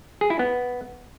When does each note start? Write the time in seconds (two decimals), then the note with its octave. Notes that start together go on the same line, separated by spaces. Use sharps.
0.21 G#4
0.30 E4
0.39 B3